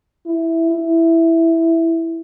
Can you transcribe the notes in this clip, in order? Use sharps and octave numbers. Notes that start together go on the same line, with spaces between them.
E4
E4